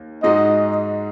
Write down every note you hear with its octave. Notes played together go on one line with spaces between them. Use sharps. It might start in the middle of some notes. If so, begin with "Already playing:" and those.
Already playing: D#2
G#2 G#3 D#4 F#4 D#5